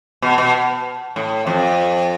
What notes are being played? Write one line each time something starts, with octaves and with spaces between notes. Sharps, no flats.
B2
B2
A2
F2